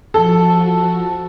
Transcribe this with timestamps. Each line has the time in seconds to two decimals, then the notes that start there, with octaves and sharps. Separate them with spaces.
0.14 F3 F#4 A4